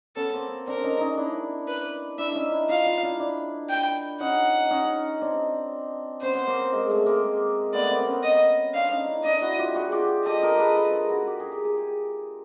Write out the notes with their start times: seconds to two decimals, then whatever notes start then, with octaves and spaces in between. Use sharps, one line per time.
0.16 B3 C#4 A4
0.33 A#3 C4
0.67 C4 D4 A#4
0.84 C#4 D#4
1.01 C#4 D#4
1.17 D4 E4
1.68 B4
2.18 D4 E4 E5
2.35 C#4 D#4
2.52 D4 E4
2.69 D#4 F4 F5
2.86 D#4 F4
3.03 D4 E4
3.19 D4 E4
3.70 G5
4.20 C#4 D#4 F#5
4.70 C#4 D#4
5.21 C4 D4
6.21 B3 C#4 C5
6.34 B3 C#4
6.47 A#3 C4
6.72 G#3 A#3
6.90 A3
7.06 G#3 A#3
7.73 A3 B3 D5
7.84 B3
7.90 A#3 C4
8.07 B3 C#4
8.23 D#5
8.74 C4 D4 F5
8.91 C#4 D#4
9.08 D4 E4
9.24 D4 E4 D#5
9.42 E4 F#4
9.59 F4 G4
9.75 F#4 G#4
9.92 F4 G4
10.26 G4 A4 D#5
10.43 G#4 A#4
10.59 A4 B4
10.76 A4 B4
10.93 G#4 A#4
11.10 F#4 G#4
11.27 G4
11.40 G#4
11.52 G4
11.65 G#4
11.78 G4